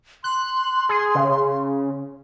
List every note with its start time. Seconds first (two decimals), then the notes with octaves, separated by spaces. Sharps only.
0.24 C6 F#6
0.89 G#4
1.15 C#3